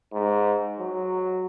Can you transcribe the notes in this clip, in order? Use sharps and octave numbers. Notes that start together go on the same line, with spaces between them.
G#2
F#3